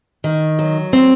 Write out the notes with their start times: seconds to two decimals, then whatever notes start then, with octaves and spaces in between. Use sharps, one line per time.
0.24 D#3
0.59 F#3
0.93 C4